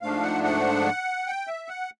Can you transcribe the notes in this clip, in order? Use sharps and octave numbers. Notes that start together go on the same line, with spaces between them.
G#2 F3 A3 D4 F5
F#5
F#5
G5
E5
F#5